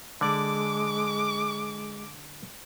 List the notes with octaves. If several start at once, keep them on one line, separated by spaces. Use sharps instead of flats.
D3 G#3 D5 D6